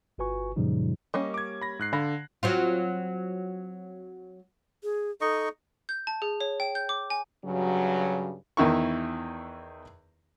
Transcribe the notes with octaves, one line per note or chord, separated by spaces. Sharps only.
G1 F4 F#4 B4 G#5 C#6
F#2 A#2 C#3 F3 G3 D#4
G3 A#3 C#4 D#5
D6 G#6
B5 A#6
G#2 F#6 C7
D3 F5 B5 A#6
F#3 C4 F4
G#4
D#4 A4 D#5 C#6
G6
A5
G#4
C#5
G5
G6
D6
G#5
G2 C#3 F#3
E2 D#3 E4 C#6